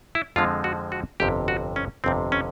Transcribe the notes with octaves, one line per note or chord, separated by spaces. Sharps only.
E4
F2 D3 F3 G#3 C4 F4
F#4
F#4
G1 F2 C3 G4
F#4
C#4
G1 F2 C3 C4
C#4